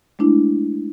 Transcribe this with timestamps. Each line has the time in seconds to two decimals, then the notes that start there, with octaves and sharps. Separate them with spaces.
0.19 G#3 A3 D4 E4